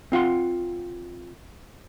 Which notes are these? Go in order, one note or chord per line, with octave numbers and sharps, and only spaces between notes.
C4 F4 F#5 C6